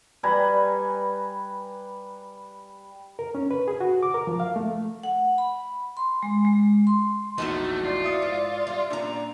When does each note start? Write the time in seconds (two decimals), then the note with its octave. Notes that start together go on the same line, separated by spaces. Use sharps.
0.23 G3 B4 G#5 A#5
3.19 A#4
3.35 C#4
3.51 B4
3.68 G#4
3.81 F#4
4.03 D6
4.14 A#4
4.27 F3
4.40 F5
4.56 A3
5.03 F#5
5.38 B5
5.97 C6
6.23 G#3
6.45 G#3
6.87 C6
7.38 A#1 E2 A3 D#4 E4 F#4 D#5
7.84 F4 D5
8.04 E5 D#6 C#7
8.22 G#2
8.67 G3
8.90 A#2 C#4 D4 A#5